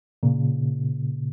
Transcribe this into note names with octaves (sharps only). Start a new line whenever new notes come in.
A#2 C#3